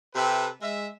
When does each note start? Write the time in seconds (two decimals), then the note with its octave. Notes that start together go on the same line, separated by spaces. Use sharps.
0.15 C3 G4 A4 B4 E5
0.62 G#3 E5